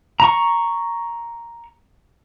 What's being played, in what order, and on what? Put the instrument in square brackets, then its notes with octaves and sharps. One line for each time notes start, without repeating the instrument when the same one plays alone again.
[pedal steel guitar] A#5 C#6